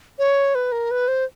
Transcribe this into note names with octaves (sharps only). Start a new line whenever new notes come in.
C#5
B4
A#4
B4
C5